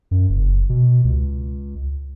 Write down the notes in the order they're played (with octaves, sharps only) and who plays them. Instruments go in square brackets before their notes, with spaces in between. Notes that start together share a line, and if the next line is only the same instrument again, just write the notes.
[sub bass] F#2
F#1
B2
C#2